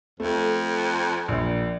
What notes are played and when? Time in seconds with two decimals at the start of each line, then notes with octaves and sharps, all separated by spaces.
0.20 F2 A3
1.28 A#1 A#2